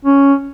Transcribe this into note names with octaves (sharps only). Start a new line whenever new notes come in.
C#4